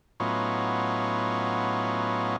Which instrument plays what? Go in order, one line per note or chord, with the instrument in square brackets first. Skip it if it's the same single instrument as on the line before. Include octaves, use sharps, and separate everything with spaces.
[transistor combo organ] A2 F#3 B3 C#4 D#4 F4